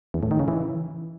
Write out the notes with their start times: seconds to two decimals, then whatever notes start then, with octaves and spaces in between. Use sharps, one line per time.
0.14 E2
0.23 A2
0.31 D#3
0.39 C#3
0.48 E3